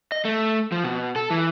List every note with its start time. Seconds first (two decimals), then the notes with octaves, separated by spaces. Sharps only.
0.12 D#5
0.25 A3
0.72 F3
0.84 B2
1.16 A4
1.30 E3